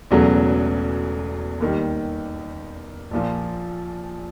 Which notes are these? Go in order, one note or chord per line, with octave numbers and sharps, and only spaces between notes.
E1 E2 C#3 F#3 A3
D#2 D#3 G3
A#1 A#2 F3